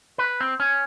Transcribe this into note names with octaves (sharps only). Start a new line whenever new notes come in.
B4
C4
C#4